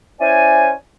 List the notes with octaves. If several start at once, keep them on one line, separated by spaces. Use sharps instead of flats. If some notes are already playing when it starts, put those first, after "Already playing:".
C#4 E4 C5 D5 G#5